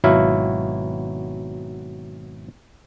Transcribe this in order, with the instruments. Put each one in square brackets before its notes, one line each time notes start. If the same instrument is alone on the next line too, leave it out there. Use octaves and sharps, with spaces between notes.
[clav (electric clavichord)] G#1 B2 F#3 E4 E5 F5